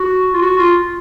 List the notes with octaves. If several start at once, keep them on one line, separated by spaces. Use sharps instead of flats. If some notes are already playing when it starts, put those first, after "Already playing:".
Already playing: F#4
F4
F#4
F4